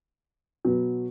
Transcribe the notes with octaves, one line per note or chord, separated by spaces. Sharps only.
B2 F#3 B3